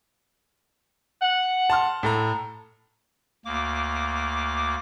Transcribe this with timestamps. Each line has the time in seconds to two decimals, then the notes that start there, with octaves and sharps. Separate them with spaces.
1.21 F#5
1.70 A5 C6 F6
2.03 A2 A4 A#5
3.45 D2 A#3 D6